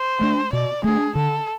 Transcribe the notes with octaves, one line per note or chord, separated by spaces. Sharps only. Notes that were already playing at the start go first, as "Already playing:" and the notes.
Already playing: C5
A3 D4
B2 D5
A3 D4 G#4
D3 A4